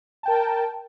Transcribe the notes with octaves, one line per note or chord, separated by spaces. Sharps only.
A#4 G5 A5